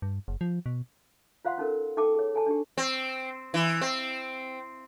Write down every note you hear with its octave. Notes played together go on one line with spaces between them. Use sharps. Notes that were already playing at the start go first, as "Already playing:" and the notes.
G2
F#1
F3
B2
F4 C5 F5 F#5 C6
C#4 D#4 A4 A#4
D#4 A4 G5 A5 D6
G#4 C#5
A4 G#5 A5
D4 D#4 G4
C4
E3
C4